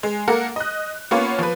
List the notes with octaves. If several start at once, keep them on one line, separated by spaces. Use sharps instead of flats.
G#3
A#3 A4 A#4 F#5
D#5 F#6
A#3 B3 C#4 F4 C#5
F3 B4